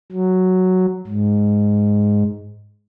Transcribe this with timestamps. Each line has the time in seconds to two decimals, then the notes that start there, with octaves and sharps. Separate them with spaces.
0.12 F#3
1.07 G#2